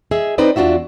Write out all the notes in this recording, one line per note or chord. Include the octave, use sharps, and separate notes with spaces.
G#4 D#5 E5
C4 D#4 B4 C5 D5 D#5
E2 D4 F4 F#4 E5